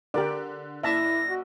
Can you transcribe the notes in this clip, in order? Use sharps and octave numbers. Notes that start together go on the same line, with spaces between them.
D3 G4 A#4 D5
F#1 E4 D5 E5 A5 E6 A#6
F#4